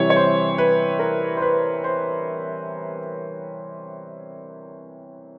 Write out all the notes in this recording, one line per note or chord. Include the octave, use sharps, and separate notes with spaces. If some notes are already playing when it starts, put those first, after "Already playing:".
Already playing: C3 E3 G3 C#5
C#5
C5
B4
A#4
C5
B4
C5